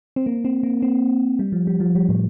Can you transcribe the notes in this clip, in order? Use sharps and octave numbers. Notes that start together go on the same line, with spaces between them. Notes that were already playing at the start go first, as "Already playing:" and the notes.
C4
A#3
C4
A#3
C4
G3
F3
G3
F3
G3
A2